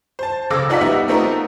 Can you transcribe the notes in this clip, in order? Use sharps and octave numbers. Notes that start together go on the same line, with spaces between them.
C5 A5
C#2 C#3 A4 D6 E6 A#6
F1 D#4 F4 D5 F#5 B6
G3 B3 D#4 F#4 E5
A3 B3 C4 D#4 F4 A#4